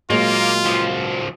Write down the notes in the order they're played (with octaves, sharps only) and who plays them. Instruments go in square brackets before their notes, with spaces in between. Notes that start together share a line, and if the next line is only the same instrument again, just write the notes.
[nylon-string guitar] A#2 F#3 G#3 [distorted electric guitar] A#3 [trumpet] F4
[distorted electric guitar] C#2 F3